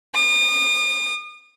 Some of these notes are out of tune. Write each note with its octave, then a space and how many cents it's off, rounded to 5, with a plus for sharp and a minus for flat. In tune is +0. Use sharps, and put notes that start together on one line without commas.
D#6 -40